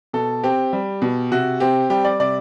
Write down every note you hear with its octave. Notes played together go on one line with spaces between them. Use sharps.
B2 A4
C4 G4
G3
B2
C3 F#4
C4 G4
G3 G4
D5
C3 D5